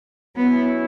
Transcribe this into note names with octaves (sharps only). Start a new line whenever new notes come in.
F#3 B3 C#4 E4